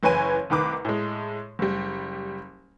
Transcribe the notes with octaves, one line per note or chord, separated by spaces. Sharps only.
F#1 E3 B4 C#5 G#5 D#7
C2 D#3 B4 D6
A2 G#3
F#1 G3